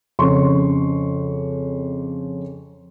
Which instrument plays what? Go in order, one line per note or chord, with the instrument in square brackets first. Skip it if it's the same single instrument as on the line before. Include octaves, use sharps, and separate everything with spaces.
[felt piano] F2 C#3 C#4 C6 C#6